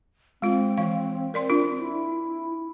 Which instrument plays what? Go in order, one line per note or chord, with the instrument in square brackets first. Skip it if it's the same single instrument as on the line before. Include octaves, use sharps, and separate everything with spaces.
[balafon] G#3 F4 [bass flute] C4
[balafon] E3 F5
A#4 D5 C6
D4 F4
[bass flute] E4